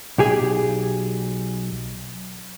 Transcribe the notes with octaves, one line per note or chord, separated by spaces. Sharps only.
B1 G4 G#4